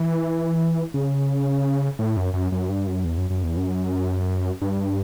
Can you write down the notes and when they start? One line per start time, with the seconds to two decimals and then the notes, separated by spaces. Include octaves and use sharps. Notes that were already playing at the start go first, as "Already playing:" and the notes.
Already playing: E3
0.94 C#3
1.99 A2
2.17 F#2
2.34 F#2
2.52 F#2
2.69 G2
2.87 F#2
3.05 E2
3.18 F#2
3.30 F#2
3.43 E2
3.57 F#2
4.62 G2